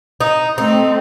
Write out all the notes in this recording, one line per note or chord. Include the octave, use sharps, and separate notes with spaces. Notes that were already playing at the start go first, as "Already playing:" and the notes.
D#4
A3 C4 D#4